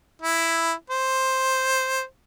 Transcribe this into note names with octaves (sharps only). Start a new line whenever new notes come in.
E4
C5